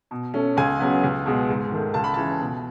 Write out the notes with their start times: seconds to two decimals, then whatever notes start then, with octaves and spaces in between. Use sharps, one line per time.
0.11 B2
0.34 A3 C#4
0.57 C#2 G#5
0.80 C#3 F#3 B3
1.03 C#2
1.26 B2 G#3 B3
1.49 G#2
1.72 D#3 A3
1.94 C#2 A5
2.04 B5
2.14 C#3 E3 A5
2.40 B2